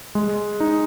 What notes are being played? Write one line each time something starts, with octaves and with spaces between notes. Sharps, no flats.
G#3
D#4